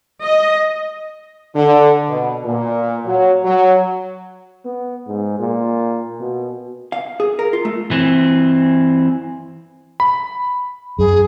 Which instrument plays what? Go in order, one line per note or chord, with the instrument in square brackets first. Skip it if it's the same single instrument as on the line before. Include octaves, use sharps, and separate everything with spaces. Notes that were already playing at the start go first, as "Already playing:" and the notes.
[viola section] D#5
[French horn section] D3
B2
A#2
F#3
F#3
[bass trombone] B3
G#2
A#2
B2
[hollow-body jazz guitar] F5
G#4
A#4
F4
A3
[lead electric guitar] E3 C4
[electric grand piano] B5
[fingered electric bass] F#2 [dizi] G#4